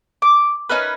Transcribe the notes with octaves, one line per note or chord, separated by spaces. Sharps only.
D6
C#4 D#4 A#4 B4